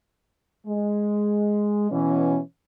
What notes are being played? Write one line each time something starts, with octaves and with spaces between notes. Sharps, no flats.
G#3
B2 E3 C#4